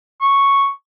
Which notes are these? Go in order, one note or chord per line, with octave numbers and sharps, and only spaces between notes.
C#6